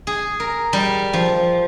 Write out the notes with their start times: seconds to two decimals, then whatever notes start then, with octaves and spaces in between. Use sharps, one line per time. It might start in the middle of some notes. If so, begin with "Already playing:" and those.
0.07 G#4
0.40 A#4
0.73 G3
1.13 F3